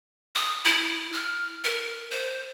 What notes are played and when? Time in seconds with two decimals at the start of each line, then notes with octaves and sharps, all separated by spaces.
0.35 D#6
0.65 E4
1.13 F6
1.64 A#4
2.11 C5